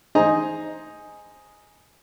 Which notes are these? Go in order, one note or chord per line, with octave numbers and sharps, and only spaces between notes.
D#4 G#4 C5 D#5 G#5 A#5